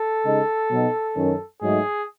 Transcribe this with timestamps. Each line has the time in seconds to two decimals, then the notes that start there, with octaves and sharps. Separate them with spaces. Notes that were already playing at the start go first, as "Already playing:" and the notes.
Already playing: A4
0.24 C#3 G#3 D#4
0.70 B2 F#3 B3 D#4
1.16 F#2 D#3 F#3 C#4
1.62 G#2 F#3 A3 D#4 G#4